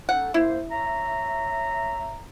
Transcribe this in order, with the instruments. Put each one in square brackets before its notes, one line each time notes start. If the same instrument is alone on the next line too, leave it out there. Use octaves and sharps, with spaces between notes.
[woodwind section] C#4 D#4 A4 [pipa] F#5
[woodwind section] F#2 A#3 C5 [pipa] E4
[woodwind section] C#5 E5 A#5